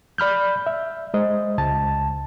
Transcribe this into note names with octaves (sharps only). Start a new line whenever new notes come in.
D5 B5 F6 G6
E5
G#3 C5 D#5
C#2 A5